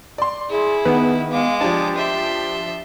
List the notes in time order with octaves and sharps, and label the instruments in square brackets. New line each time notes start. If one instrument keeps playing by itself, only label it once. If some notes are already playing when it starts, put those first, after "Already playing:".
[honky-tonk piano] D5 C6
[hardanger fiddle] E4 [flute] G#4
[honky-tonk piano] D#3 [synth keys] B3
[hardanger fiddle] G#3 D6 [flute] F5
[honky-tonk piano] F3 D4 [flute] G4 [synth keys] A5
[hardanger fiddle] E5 C6